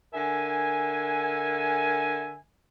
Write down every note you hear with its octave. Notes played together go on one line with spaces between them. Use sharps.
D3 A#4 E5 G#5